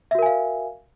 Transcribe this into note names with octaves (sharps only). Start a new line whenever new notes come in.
F#4 A#4 E5 F5 G#5